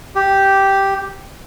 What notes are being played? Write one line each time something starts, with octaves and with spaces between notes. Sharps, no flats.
G4